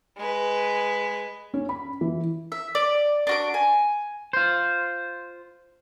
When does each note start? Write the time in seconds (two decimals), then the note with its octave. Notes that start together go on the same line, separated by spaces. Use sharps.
0.17 G#3 B4
1.54 C#4
1.69 B5
2.01 E3
2.52 E5
2.75 D5
3.27 D4 F#4 D6
3.54 G#5
4.33 F4 C5